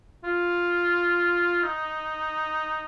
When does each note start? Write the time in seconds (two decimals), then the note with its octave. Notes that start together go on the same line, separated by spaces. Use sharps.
0.24 F4
1.63 D#4